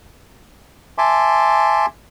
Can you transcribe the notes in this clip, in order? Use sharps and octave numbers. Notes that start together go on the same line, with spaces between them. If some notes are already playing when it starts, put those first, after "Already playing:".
E5 G#5 A5 C6 D6